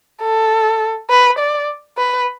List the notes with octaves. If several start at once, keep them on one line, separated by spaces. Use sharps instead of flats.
A4
B4
D5
B4